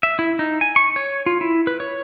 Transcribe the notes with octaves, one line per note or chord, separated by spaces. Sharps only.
E5
E4
D#4
G#5
C#6
C#5
F4
E4
B4
C#5